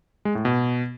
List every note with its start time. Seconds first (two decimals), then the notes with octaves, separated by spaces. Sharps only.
0.25 G#3
0.35 A2
0.45 B2